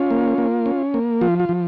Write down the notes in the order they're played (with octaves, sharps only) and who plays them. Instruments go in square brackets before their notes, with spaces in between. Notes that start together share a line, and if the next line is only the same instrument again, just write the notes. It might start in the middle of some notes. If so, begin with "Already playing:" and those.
Already playing: [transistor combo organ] C#4 F4
A#3
A#3
C#4
A#3
F3 F4
F4
F3